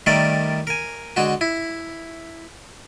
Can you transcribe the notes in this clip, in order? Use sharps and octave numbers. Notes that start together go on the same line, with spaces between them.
D#3 G3 A3 A#4 D5
A#4 G#5
D3 G#3 F#4
E4